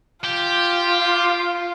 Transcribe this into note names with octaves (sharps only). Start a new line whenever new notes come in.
F4 G4